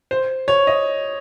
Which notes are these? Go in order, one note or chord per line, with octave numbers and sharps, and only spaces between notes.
C5
C#5
D#5